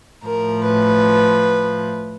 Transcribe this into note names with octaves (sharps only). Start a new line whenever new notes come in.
A2 F3 A#4
B4